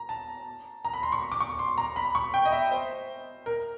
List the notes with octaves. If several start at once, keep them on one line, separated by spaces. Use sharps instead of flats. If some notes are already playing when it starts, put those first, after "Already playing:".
Already playing: A#5
A5
A#5
B5
C6
C#6
D6
C#6
C6
A#5
B5
C#6
G5
D#5
E5
C5
A#4